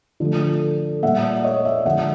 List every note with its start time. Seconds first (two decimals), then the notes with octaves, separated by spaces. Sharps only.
0.20 D3 F3 A3
1.02 A#2 G3 A#3 E5 F#5
1.23 D5 E5
1.44 C#5 D#5
1.65 D5 E5
1.85 D3 F3 G#3 E5 F#5